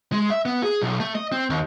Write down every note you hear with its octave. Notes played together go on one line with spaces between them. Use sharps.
G#3
E5
B3
G#4
B1
A3
D#5
C4
D#2